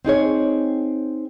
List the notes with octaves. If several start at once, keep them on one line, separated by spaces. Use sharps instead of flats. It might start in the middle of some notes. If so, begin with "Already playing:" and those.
C4 D#4 G#4 C#5